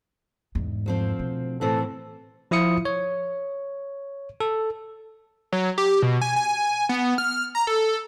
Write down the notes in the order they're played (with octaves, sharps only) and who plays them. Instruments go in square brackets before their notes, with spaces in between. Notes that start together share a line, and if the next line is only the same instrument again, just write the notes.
[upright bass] E2 G#2
[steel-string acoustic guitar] D2 F3 C4
[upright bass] B2
[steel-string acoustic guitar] A2 E3 C4 [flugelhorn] A4
[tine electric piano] F3 E4 F4 D#6 C#7
C#5
A4
[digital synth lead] F#3
G4
B2
G#5
G#5
B3
F6
A#5
A4